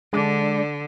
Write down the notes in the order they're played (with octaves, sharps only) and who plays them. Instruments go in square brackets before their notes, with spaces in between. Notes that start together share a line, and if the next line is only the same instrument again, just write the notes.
[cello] D3 [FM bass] G#3 [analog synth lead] D4